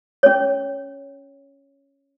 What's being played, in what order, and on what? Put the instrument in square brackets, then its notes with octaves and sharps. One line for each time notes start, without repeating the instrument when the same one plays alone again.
[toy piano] C#4 C#5